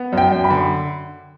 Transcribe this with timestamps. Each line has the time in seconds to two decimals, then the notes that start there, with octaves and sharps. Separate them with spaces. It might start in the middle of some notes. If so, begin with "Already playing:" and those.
Already playing: B3
0.12 F#2
0.18 G5
0.31 F#2
0.44 B5
0.50 D3